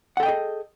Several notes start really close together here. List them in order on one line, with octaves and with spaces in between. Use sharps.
F#5 A4 G5 D#5 G#4